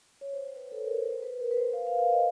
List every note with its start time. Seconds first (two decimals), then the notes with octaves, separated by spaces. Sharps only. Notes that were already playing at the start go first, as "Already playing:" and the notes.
0.21 C#5
0.33 C5
0.38 C#5
0.47 C5
0.56 B4
0.72 A4
0.84 A#4
0.98 C5
1.11 C5
1.22 B4
1.40 A#4
1.51 B4
1.57 C5
1.73 F5
1.87 F5
1.99 F5
2.12 D#5